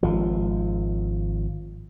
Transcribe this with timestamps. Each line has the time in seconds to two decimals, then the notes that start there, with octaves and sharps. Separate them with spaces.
0.03 G#1 F3